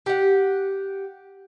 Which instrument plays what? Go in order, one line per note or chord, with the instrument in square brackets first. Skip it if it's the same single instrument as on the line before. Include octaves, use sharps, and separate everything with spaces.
[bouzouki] G4 F#5